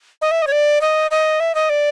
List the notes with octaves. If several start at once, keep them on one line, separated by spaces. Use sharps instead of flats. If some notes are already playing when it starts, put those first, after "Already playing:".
D#5
E5
D#5
C#5
D5
D#5
D#5
E5
D#5
D5